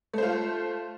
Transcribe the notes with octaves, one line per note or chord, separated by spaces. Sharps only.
A3 F4 C5